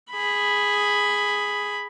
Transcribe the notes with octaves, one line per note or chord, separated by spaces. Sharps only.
G#4 B5